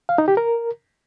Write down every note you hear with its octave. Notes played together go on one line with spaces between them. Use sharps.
F5
D#4
G4
A#4